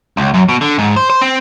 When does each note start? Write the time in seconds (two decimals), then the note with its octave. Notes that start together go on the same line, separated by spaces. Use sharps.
0.17 C#2
0.34 F#2
0.49 B2
0.61 D3
0.78 G#2
0.96 C5
1.10 C5
1.21 C4